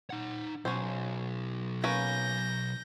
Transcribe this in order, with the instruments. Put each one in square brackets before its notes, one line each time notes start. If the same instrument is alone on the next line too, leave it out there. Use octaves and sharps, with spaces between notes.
[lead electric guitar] D#4 F#5
[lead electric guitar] B1 [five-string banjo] C#4 F#4 C5
[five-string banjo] A#3 C#4 B4 [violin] G6 A#6